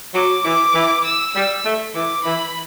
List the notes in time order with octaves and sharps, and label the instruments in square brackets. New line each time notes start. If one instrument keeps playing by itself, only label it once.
[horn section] F#3 [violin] D6
[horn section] E3 [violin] D6
[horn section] E3
[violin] E6
[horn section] G3 [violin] E6
[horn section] A3
[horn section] E3 [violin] D6
[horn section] E3 [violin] B5